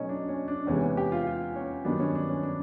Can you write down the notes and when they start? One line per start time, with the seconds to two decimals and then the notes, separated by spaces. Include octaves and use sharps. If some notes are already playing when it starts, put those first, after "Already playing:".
Already playing: B2 F#3 A3 C#4 D#4
0.09 D4
0.29 C#4
0.48 D4
0.67 E2 C3 E3 G#3 C#4
0.82 C#4
0.97 G4
1.12 F4
1.27 F4
1.56 C#4
1.85 G2 D#3 F#3 B3 D4
1.99 C#4
2.15 D4
2.29 C#4
2.43 D4